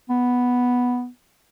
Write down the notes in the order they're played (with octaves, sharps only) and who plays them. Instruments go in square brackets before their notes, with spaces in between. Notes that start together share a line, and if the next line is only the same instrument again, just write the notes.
[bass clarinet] B3